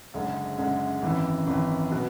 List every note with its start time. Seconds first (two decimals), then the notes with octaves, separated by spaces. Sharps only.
0.14 F#1 F#2 D3 G#3
0.58 F#1 F#2 D3 G#3
1.02 G#1 F#2 E3
1.47 G#1 F#2 E3
1.91 B2 F#3 B3 F#4